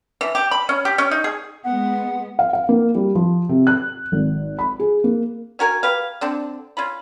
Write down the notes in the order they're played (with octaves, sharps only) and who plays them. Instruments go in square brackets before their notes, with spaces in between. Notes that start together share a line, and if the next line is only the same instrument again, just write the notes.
[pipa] E3
G4
B5
C#4
G4
C#4
D#4
G#4
[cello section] G#3 B3 [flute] F#5
[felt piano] F5
F5
A#3
G3
F3
C3
F#6
G#1
B5
G#4
A#3
[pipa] C#4 F#4 A#4 G#5
G4 B4 F5
D3 C4 D4
C#4 F4 B5